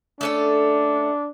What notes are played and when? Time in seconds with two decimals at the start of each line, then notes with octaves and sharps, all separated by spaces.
0.21 A3 C#4 D4 A4